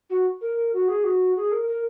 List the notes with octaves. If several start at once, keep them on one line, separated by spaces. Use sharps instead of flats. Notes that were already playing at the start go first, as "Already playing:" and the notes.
F#4
A#4
F#4
G#4
F#4
G#4
A#4
A#4